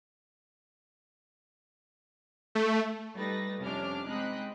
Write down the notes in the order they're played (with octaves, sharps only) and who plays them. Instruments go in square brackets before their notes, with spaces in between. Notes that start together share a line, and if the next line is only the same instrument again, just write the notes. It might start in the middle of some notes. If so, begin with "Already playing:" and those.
[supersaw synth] A3
[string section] G3 A3 D#4 B4 A6 A#6
F2 C3 C#4 D4 D6 F6
G#3 C4 D#4 D#5 B5 F#6